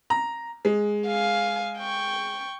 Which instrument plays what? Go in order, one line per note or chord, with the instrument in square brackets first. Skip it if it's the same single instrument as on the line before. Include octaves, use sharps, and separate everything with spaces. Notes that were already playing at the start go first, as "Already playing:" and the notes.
[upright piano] A#5
G#3
[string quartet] F5 G#5
G5 C#6